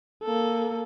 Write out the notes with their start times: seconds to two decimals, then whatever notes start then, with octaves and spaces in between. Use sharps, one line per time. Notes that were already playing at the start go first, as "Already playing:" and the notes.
0.23 A#3 A4